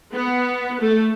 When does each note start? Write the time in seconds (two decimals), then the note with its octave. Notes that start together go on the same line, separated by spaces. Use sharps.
0.14 B3
0.80 A3